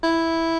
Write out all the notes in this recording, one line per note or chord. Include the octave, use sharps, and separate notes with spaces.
E4